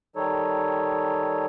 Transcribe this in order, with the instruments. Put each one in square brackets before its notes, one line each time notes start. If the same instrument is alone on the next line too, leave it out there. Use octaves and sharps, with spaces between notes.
[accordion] D#3 G3 D#4 A4 C#5